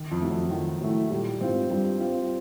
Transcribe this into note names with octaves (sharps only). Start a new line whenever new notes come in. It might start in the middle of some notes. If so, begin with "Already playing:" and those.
Already playing: D#3
F2
F#3 A3
F2
F2 D#3
A2 F#3 A3
A#2 G3
G#2 C4 F4
G2 G3
C4 F4